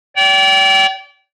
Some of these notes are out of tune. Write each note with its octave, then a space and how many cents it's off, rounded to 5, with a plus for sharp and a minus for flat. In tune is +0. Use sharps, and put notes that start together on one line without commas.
D5 -40 G5 -25